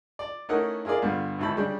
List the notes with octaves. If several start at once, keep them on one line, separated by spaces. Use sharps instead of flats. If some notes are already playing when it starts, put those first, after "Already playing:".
D5
A3 C#4 D#4 E4 A#4 F#5
E4 F4 G#4 A#4 D5
G2 D3 B3 F4
G#1 C#2 E4 A5 B5
C#3 G3 D4